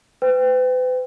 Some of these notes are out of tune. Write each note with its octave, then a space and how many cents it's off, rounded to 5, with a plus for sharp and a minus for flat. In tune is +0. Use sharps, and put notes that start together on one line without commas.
B4 +45 G5 +10